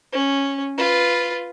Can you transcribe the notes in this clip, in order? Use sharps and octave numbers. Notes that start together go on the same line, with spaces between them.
C#4
F4 B4